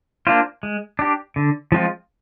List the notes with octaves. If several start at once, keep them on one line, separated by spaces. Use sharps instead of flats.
A#3 D4 F4 C5
G#3
D4 G4
D3
F3 G#3 C4 F4